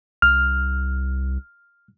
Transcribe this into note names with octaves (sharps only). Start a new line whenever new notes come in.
C2 F6